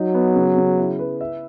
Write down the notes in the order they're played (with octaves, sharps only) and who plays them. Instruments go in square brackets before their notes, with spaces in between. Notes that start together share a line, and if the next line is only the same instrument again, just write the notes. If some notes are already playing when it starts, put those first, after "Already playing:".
Already playing: [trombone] F#3 [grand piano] D#4
[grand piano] B3
C#3
C#3
E4
B4
E5